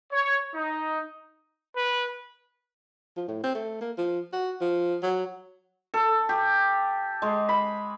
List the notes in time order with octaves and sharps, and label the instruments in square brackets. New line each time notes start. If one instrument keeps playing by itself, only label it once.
[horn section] C#5
D#4
[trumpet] B4
[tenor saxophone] F3
A2
C4
A3
A#3
F3
F#4
F3
F#3
[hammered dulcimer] A4
G4
G#3
B5